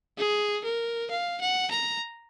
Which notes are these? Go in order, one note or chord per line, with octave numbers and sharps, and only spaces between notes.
G#4
A#4
F5
F#5
A#5